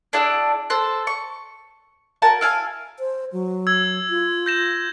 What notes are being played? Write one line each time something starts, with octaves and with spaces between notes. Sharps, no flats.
D4 E4 G#4 F#5
A4 C5 F#6
C#6
F#4 A#4 G#5 A5
E4 F5 G#5
C5
F#3
E6 G#6
F4
G6 A#6 E7